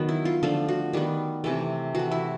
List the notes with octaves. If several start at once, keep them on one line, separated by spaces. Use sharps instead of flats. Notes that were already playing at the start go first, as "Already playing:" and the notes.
Already playing: D#3 F#3 B3
E4
F4
D3 F3 A3 F4
F#4
D#3 G3 B3
C3 E3 A3
E3 A3 F#4
E4